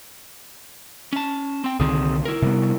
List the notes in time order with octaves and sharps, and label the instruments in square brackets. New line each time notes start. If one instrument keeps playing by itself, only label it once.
[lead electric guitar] C#4 A5
C4 G5
[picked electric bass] C2 D3 D#3 [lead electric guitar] C4 G#4
[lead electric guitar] E4 A#4
[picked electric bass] C3 G3 B3